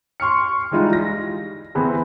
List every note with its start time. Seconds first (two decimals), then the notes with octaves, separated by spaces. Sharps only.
0.20 C6 C#6 F6 C#7
0.72 E3 G3 G#3 D#4 F4
0.93 A#6
1.75 E3 B3 C4 G#4